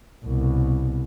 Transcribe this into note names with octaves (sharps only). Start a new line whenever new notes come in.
C2 B2